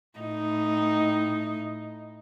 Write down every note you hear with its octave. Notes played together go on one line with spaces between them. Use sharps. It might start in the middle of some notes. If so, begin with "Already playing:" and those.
A2 D#4